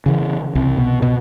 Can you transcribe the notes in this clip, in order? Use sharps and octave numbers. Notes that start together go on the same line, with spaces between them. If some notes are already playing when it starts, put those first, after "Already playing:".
C#3 E3
C2
B2
B2